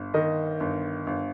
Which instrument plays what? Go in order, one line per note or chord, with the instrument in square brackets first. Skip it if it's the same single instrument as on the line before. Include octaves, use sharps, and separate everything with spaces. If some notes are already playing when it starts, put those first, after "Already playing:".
Already playing: [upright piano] G1
D#3 D#5
G1
G1